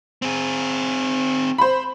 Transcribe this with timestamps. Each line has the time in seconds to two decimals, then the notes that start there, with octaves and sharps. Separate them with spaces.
0.22 C4 G#4
1.58 C5 B5